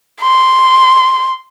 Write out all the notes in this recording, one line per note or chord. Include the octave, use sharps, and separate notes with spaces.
C6